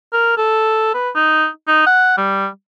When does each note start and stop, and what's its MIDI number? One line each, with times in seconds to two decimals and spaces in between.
0.13 0.35 70
0.37 0.93 69
0.94 1.10 71
1.15 1.47 63
1.67 1.85 63
1.86 2.18 78
2.18 2.47 55